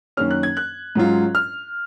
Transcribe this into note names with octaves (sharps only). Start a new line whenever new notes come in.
F#2 D#3 A#3 C#4 F6
F#6
G#6
F#6
G#2 F#3 C#4 F4
F6